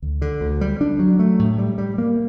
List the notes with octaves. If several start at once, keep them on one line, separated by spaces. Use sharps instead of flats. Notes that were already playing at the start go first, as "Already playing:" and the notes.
D2
D3
D2
G3
D4
F#3
A3
A2
G3
G3
A#3